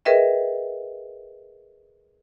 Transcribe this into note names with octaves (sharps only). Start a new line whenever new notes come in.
G#4 A#4 B4 D#5 E5 G5